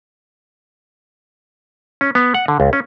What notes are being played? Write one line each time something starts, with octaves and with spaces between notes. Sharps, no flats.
C#4
B3
F#5
D3
C#2
C#4